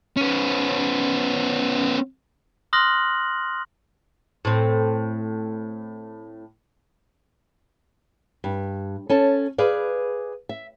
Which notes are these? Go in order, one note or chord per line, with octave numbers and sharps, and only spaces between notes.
B3 C#4
C6 D#6 F6 F#6 A#6 F#7
A2 C4
G2
C#4 A4 A5
G#4 B4 D5 F5
E5